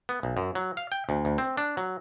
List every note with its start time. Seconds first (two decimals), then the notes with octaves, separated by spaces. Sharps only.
0.09 B3
0.23 B1
0.37 F#2
0.55 F#3
0.77 F5
0.92 G5
1.09 D2
1.25 D2
1.38 C4
1.57 D4
1.77 F#3